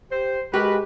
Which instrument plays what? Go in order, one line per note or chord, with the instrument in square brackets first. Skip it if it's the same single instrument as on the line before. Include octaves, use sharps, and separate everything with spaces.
[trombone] G4 [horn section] C5
[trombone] G#3 [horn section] F#4 A#4 B4 [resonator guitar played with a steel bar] G4